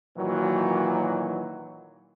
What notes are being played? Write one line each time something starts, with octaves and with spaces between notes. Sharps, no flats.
A#2 D#3 E3 F#3